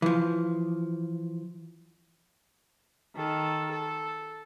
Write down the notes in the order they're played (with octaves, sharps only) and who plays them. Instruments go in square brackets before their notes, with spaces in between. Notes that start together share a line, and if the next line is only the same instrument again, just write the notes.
[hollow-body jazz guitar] E3 F3
[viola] D#3 A4
A4